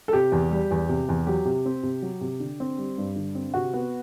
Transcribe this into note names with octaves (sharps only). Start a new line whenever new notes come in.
A4
C3 G4
E2
G3
E2
C3
E2
F#3 G4
C3
C4
C3
F#3
C3
D3
C4
G3
G2
D3
C4
C3 F#4
B3